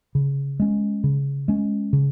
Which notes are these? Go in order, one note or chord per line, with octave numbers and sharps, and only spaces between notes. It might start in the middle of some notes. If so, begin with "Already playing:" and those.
C#3
G#3 C#4
C#3
G#3 C#4
C#3